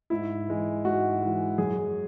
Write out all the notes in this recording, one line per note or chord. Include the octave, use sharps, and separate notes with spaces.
G#2 E4
E3 G#3
G#2 F#4
E3 G#3
F#2 G#4